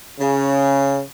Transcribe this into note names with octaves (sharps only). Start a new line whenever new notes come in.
C#3